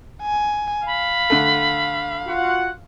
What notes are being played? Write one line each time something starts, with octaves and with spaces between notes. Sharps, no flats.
G#5
F5 B5
D3 A3
F4 F#4 F#5